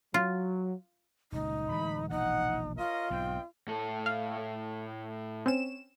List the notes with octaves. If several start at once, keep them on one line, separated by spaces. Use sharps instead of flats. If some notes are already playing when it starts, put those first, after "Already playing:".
F#3 F4
D#1 C#2 D#4
D1 E3 G#3 B5
E1 A#1 D#4 F#5
F4 A#4 C#5 D#5
B1 G#2 C4 D#5 G5
A2 A4
F5
C4 C#4 E7